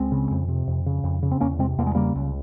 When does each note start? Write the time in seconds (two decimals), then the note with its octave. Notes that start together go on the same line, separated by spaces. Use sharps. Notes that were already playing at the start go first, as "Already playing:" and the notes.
Already playing: C#2 G#3 C4
0.12 C#3
0.31 F2
0.48 C3
0.67 F2
0.86 C#3
1.04 F2
1.23 C#3
1.31 C4
1.40 E2 A#3 C#4
1.59 C3 G#3 C4
1.78 E2 A#3
1.86 G#3
1.95 C#3 G3 A#3
2.15 C#2